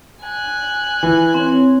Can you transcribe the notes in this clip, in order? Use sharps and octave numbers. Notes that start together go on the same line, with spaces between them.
G#5 F#6
E3
C4 C#5